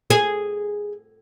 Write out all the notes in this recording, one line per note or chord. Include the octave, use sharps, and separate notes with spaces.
G#4